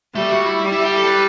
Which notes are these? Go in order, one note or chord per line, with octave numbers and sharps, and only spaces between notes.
G3 A3
F#4
E4
G3
E4
G4
A4
B4